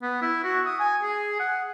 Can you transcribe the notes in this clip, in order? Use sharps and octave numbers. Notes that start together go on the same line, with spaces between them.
B3
E4
F#4
D#6
G#5
G#4
F#5